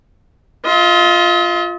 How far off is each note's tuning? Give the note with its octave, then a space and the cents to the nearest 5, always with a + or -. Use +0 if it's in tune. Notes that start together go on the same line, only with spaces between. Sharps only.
F4 +0 D#5 +45